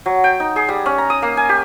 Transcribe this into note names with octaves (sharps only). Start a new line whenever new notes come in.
F#3
G5
D#4
G#4
G3
C#4
A#5
D#6
A#3
G#5
G4